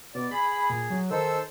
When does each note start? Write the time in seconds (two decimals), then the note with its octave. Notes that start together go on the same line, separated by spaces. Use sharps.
0.15 B2 D5
0.31 G#4 B5
0.70 A#2
0.90 F#3
1.11 D#3 A4 C5 E6